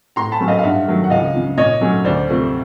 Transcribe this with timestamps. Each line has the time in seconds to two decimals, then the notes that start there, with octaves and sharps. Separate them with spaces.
0.16 A2 A#5 C6
0.32 A5 B5
0.40 F#3 A3 C#4
0.48 D#5 F5
0.59 F5
0.63 G2 E5 F#5
0.88 D#3 F#3 A3
1.04 F#5
1.10 C#2 D#5 F5
1.34 C#3 F3
1.57 A#2 C#5 D#5
1.81 F#3 A3 C#4
2.05 D2 C5 D5
2.29 C3 F3 A3 C4